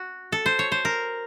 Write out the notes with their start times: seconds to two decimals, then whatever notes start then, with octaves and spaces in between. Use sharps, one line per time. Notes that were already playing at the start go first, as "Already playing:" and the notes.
Already playing: F#4
0.32 A4
0.46 C5
0.59 C#5
0.72 C5
0.85 A#4